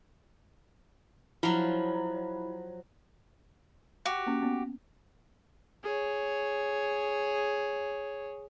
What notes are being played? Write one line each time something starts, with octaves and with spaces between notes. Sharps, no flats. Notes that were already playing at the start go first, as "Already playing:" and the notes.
F3 F#3 E4
F#4 G4
A#3 C#4
B3 C#4
G#4 C#5